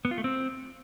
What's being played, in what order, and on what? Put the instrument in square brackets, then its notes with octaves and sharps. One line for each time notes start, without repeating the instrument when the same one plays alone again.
[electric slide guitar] B3
F4
A3
C4